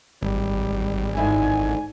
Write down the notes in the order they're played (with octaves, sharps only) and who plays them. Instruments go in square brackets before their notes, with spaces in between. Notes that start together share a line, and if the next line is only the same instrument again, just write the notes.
[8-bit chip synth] G#1 [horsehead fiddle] G3
[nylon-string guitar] G#2 D3 E4 [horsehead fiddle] G#5